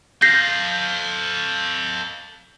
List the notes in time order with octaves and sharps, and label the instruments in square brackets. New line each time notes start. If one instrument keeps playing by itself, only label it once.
[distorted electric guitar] A4 F5 [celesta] G6 A#6 C7